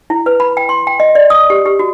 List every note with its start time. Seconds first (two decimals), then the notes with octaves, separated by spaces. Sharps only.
0.10 E4
0.26 B4
0.40 B5
0.57 G5
0.69 C6
0.87 G5
1.00 D#5
1.15 D5
1.30 D#6
1.50 G4
1.65 G4
1.79 F#4